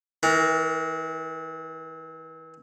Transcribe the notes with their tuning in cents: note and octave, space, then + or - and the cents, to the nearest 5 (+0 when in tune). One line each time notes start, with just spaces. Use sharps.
E3 -35 A#4 +0